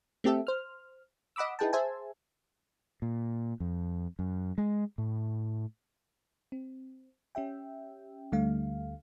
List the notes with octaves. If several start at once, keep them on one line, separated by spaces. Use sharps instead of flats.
A3 C4 G4 A4 E5
C5 F6
D#5 F#5 B5 D6 E6
D#4 E4 G#4 B4 G5 A5
G#4 C5 E5 G#5 A5
A#2
F2
F#2
G#3
A2
C4
C#4 G4 E5 G5
D2 D3 G3 A3 F5